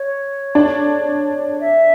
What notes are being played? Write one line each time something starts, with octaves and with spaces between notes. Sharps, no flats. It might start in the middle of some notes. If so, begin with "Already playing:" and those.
Already playing: C#5
D4
E5